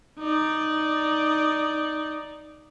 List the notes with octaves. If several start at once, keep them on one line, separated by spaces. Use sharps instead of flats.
D#4 D5